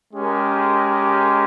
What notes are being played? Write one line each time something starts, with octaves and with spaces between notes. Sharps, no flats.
G#3 C#4 G4 A#4